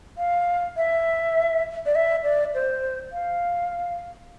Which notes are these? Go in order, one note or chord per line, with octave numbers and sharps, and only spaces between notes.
F5
E5
D5
E5
D5
C5
F5